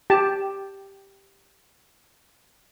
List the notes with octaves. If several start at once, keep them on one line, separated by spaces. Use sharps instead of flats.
G4 A5